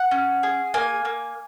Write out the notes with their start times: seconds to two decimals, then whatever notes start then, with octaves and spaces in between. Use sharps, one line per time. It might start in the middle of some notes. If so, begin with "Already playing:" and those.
Already playing: F#5
0.11 C#4
0.43 G#4
0.74 A#3 G#5
1.05 A#3